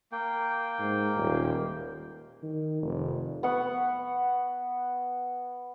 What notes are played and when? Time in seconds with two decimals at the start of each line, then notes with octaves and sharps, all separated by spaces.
0.12 A#3 G5
0.79 G#2
1.17 D#1
2.43 D#3
2.83 F1
3.43 B3 F#5 C#6